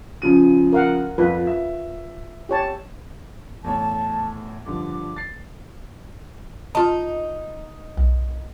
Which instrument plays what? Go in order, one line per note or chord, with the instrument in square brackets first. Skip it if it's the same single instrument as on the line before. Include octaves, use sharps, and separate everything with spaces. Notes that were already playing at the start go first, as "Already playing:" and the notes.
[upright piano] C#3 F3 D#7
[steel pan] A#4 F5 F#5
[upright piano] F2 [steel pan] F4 B4
[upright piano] E5
[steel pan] G4 C#5 A5
[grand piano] E2 A2 C#5 [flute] A5
[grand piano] G2 D3 F3 [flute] D6
[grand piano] A6 C7
[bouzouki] D#4 [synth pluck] F4 A5
[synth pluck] B1